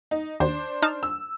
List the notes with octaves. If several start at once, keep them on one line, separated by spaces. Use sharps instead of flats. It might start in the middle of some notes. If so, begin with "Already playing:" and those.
D#4
D#2 D4 C5
D#4 A5 F6
E6